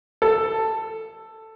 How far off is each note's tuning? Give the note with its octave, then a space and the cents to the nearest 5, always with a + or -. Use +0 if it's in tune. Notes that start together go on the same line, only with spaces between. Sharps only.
A4 +10